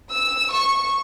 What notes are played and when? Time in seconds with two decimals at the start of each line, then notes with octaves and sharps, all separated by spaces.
0.11 E6
0.52 C#6